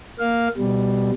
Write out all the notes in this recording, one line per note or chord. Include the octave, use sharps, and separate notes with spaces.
A#3 F5
B2 G3